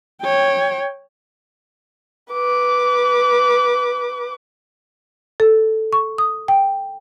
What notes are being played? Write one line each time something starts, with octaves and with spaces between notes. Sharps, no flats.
C#5 G5
B4 D6
A4
C#6
D#6
G5